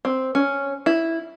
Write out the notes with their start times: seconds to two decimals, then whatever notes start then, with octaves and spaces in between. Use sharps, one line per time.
0.05 C4
0.35 C#4
0.86 E4